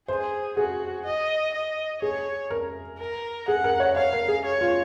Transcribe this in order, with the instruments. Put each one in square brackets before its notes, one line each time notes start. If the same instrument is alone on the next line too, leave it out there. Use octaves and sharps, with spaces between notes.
[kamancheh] G#4 [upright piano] C5
[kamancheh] F#4 [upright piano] G#4
[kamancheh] D#5
D#5
[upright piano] G#4 [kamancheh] C#5
[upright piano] A#4
[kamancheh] A#4
[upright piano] G#4 [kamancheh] F#5
[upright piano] A#4
C#5
[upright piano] C#5 [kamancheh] F5
[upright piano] A#4
G#4
[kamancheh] C#5
[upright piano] F4